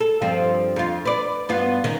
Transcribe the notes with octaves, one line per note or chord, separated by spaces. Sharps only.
A4
G2 F3 C4
F2 F4
B4 D5
G2 B3 F4
D#3 C#4